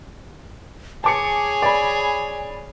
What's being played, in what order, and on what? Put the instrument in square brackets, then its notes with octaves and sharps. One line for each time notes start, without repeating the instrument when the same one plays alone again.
[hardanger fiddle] G#4 C#5 [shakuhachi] G#5 [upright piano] A5 D6 C#7
[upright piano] D5 B5